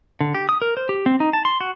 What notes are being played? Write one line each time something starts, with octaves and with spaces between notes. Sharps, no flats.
D3
G4
D#6
A#4
C5
G4
C4
D#4
A5
C6
F#4